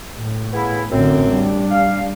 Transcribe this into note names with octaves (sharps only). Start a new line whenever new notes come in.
A2
C#3 B3 E4
A1 F#2 D3 C4
G3 D4
F5